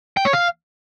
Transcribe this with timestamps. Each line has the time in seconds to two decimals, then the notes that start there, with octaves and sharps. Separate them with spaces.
0.17 G5
0.25 C#5
0.33 F5